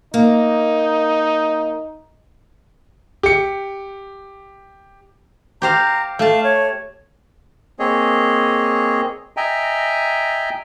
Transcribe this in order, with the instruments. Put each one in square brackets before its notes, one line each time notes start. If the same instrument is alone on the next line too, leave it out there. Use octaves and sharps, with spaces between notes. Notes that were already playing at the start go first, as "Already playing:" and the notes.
[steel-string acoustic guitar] A#3 [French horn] D#4
[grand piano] G4 C#7
[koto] G4 C5 F5 [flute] A#5
[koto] A3 A5 [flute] F5
[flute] C#5
[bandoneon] A#3 C4 G#4 C#5 D#5
D#5 E5 G5 G#5 A#5